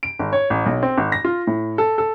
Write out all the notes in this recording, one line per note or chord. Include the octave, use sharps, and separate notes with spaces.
D7
G#1
C#5
A1
B1
C4
G#1
A#6
F4
A2
A4
A4